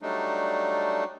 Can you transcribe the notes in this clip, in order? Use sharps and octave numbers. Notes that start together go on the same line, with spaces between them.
F#3 G3 A3 D4 D#4